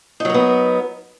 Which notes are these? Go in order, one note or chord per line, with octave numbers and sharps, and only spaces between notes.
F#3 B3 D#4 A#4